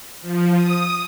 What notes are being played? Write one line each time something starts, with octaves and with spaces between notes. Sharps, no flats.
F3
D#6